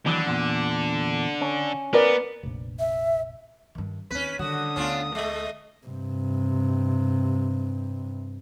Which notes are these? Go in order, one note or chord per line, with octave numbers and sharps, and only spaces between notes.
D#2 D3 E3 F#3
E2 A#2
C#4
B3 A#4 B4 D5
F1 A#1
E5
G2 D#3
D#2 C4 C#4 B4 B6
D3 D#3 G3 F#4 D#6
D2 B3 C#4 D4 F4
G#3 A3 D#5
G2 C3